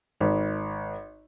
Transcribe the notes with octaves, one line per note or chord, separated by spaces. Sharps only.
G#1